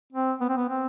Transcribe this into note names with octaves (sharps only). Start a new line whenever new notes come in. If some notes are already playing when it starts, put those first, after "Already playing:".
C4
B3
C4
B3
C4